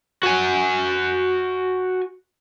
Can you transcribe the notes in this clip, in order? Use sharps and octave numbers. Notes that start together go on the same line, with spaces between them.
F#4 G#5